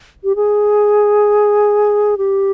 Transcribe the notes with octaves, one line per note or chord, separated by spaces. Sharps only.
G4
G#4
G4